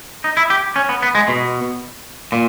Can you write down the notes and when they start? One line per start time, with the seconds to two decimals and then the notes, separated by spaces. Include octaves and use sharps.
0.24 D#4
0.37 E4
0.50 G4
0.76 C#4
0.89 B3
1.03 B3
1.15 G#3
1.28 B2
2.32 A#2